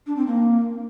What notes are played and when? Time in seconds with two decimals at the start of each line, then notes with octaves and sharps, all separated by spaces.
0.06 D4
0.16 C4
0.26 A#3